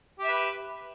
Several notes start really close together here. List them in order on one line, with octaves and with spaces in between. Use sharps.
G4 E5 B4